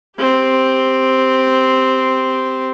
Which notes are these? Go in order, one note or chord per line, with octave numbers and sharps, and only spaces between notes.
C4 G4